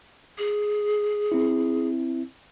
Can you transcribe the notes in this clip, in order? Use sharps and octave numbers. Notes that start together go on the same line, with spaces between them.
G#4
C4 E4